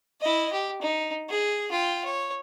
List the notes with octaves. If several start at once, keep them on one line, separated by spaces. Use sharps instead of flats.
E4 D#5
G4
D#4
G#4
F4 G5
C#5